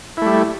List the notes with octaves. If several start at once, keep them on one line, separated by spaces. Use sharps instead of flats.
G3 A3 E4